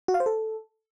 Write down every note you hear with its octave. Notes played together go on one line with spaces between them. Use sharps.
F#4
F5
C5
A4